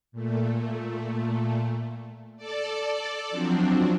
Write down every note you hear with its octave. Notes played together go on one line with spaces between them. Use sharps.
A#2 A3
A4 D5
F3 F#3 C4 D4